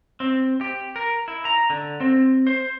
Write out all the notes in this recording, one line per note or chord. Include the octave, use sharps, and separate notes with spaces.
C4
G4
A#4
E4
A#5
D3
C4
C5